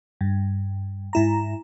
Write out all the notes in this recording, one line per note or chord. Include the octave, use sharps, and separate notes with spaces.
G2
G#2 E4 A#5